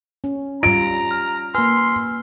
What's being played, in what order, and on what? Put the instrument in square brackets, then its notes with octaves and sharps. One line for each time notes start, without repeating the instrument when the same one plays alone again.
[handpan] C#4
[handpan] G3 F4 [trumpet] A#5 [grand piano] D7
[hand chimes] F6
[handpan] A#3 B4 [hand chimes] G#5 E6 F6 [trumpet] C6